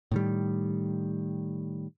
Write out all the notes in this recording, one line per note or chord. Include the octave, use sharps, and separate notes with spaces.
A2 D#3 G3